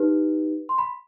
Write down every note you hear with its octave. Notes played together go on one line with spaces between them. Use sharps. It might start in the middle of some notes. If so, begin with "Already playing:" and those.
Already playing: D#4 G4 B4
C6
B5